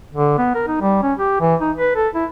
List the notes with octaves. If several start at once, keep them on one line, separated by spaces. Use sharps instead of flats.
D3
B3
A#4
D#4
G3
C#4
G4
E3
D#4
B4
A4
E4